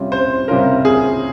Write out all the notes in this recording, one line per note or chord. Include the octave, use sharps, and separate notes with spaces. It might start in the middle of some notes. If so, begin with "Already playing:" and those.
Already playing: C3 G3 C#4 F4
C5
C3 G3 C#4 F4 A#4
G#4